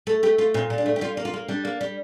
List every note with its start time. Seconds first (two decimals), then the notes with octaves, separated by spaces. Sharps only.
0.07 A3 A4
0.23 A3 G4
0.38 A3 F4
0.54 A#2 C4
0.70 A#2
0.78 D4
0.86 A3
0.96 G4
1.01 G3 F4
1.17 A#3
1.25 F4
1.34 A#3
1.48 G3 D4
1.65 A#3
1.81 G3